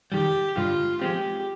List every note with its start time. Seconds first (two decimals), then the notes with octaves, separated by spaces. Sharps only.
0.12 F2 D#3 G3 G4
0.57 G2 D3 G#3 F4
1.01 F3 G#3 C4 G4